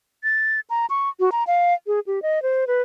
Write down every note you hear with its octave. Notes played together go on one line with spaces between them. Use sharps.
A6
A#5
C#6
F#4
A#5
F5
G#4
G4
D#5
C5
B4